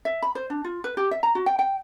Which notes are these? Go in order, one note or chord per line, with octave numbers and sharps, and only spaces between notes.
E5
B5
C5
D4
F4
B4
G4
E5
A#5
F#4
G5
G5